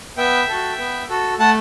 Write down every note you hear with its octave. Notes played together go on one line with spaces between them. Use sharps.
B3 E5 G5
F#4 A4
B3
F#4 A4
A3 F#5 A5